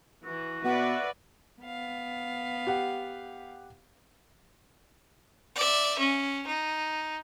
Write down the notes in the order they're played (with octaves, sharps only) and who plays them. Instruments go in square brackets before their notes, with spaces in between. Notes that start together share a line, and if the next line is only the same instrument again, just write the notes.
[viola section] E3 [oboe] F#4
[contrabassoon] B2 [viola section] B4 D5 E5 [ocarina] F#5
[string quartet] B3 F5
[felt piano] G4 F#5
[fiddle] D5 E5
C#4
D#4